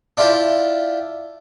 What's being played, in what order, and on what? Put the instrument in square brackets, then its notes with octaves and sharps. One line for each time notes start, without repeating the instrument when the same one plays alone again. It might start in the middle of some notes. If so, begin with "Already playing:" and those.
[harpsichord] D4 E4 F4 G4